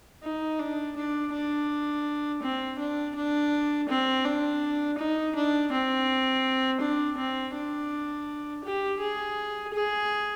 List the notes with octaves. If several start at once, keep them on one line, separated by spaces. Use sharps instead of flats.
D#4
D4
D4
D4
C4
D4
D4
C4
D4
D#4
D4
C4
D4
C4
D4
G4
G#4
G#4